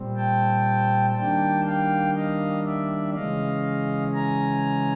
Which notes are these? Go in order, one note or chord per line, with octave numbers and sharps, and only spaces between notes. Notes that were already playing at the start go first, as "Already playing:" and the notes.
Already playing: A#2 G3 C4
G5 A5
D#3 G3 A#3 D4 G5 A5
F5 G5
D#5 F5
D5 E5
C#3 E3 G#3 C#4 D#5 F5
G#5 A#5